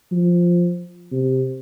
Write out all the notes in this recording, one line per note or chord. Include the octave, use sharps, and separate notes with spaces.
F3
C3